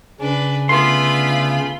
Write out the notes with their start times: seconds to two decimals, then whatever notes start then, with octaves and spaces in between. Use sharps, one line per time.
0.20 C#3 C#4 D4 B4
0.69 D3 A3 B3 F4 B5 C6